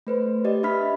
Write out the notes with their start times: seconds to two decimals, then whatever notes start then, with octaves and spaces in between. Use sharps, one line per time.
0.07 A3 B4 C5
0.45 G4 D5 D#5
0.63 D4 G4 E5 B5 F6 B6